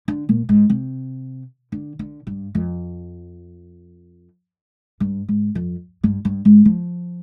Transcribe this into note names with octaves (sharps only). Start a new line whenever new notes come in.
D3
A#2
G#2
C3
D3
D3
G2
F2
G2
G#2
F2
G2
G2
G#2
F3